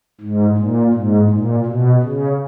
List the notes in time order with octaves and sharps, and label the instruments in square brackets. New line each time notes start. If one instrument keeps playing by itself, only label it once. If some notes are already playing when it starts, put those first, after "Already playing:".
[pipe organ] G#2
A#2
G#2
A#2
B2
C#3